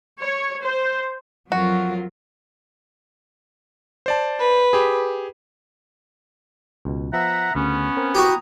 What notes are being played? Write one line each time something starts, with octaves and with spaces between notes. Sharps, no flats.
C#5
C5
F2 F#3 F4 F#4 A#4
C5 D5 A5
B4
G4 G#4
C#2 B2
F3 B3 E5 F#5 A#5
D2 C#3 B3 C#4
C4 A#4
E4 F#4 G4 A#5 D#6